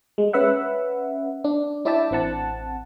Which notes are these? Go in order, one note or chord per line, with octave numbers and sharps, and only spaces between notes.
G#3
C#4 B4 E5 F#5
D4
D4 E4 D5 E5 G5 A5
A1 C4 F#5 A5